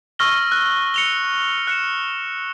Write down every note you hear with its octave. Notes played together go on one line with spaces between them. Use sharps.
C#6 E6 F6 A#6 G7
F#6
C#7 F7 G7
F#6 C#7 E7